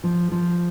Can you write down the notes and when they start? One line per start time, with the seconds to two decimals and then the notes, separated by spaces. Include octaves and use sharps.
0.04 F3
0.32 F3